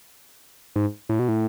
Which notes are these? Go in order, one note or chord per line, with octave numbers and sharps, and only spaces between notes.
G#2
A2
B2
A2